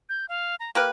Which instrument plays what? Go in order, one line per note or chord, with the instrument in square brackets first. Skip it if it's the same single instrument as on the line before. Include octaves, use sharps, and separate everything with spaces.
[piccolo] G6
F5
A#5
[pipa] A#3 G4 B4 [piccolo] F6